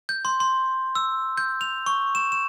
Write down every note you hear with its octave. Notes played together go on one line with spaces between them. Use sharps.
G6
C6
C6
E6
G6
F7
C#6
E7
E7